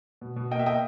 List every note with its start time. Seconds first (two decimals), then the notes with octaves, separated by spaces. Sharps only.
0.21 B2
0.36 B2
0.51 A#3 D#5 G5
0.59 E5
0.66 A#3 D#5 G5